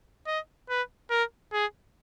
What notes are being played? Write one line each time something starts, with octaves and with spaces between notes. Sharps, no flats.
D#5
B4
A#4
G#4